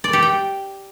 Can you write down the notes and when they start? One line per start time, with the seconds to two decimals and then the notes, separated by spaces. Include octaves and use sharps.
0.04 D5
0.13 G4
0.22 G5